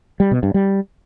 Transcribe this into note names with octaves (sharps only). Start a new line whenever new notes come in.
G3
B2
G2
G3